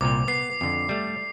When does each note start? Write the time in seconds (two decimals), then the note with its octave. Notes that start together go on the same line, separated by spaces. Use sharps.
0.01 C2 A#2 C4 D6
0.28 B3 D6 C7
0.61 F2 D3
0.89 G3 A3